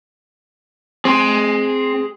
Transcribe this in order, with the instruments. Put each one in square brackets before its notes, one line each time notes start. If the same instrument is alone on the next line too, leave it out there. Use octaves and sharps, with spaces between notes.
[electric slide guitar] C4 [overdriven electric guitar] G#4 C6